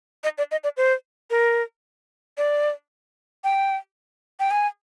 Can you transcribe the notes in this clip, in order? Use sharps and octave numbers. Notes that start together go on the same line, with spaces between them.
D#5
D5
D#5
D5
C5
A#4
D5
G5
G5
G#5